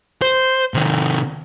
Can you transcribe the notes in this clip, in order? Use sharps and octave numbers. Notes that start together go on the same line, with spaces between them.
C5
C3 D#3